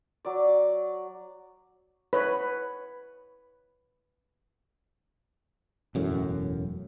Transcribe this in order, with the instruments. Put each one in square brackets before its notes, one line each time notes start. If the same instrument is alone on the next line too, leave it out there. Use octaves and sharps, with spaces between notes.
[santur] F#3 D5
[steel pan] B4 C#5
[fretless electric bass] E1 F#2 A2